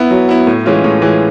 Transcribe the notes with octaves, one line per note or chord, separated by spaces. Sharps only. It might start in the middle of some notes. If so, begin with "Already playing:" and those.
Already playing: B3 E4
F#3
B3 E4
A2
E3 G#3 C#4 F4
A2
E3 G#3 C#4 F4